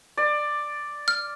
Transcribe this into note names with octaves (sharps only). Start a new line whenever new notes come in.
D5
F6